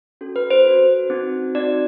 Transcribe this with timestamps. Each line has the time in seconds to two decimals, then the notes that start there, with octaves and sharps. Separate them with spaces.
0.21 C#4 F#4 A4
0.36 B4
0.51 C5
0.65 C#4 F#4 A4
1.10 C4 D#4 F#4
1.55 C4 D#4 F#4 D5